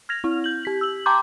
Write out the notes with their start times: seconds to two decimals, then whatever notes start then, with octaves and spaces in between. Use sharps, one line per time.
0.09 F6 G#6 A#6 F7
0.24 C4 E4
0.44 G6 F#7
0.63 G4 B6 F#7
0.81 E6 F#7
1.06 G5 A5 A#5 C6 D6 G6